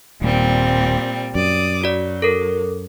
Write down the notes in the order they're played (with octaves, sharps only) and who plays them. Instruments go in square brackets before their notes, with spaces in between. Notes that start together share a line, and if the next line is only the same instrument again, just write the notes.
[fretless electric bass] D#1 [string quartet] A#2 G3 C4
[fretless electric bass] F#2 [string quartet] D5 D6 D#6
[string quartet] F#3 [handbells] F#4 D5
[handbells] A4 A#4